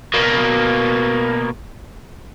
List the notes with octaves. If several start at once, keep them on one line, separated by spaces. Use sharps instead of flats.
B2 A#3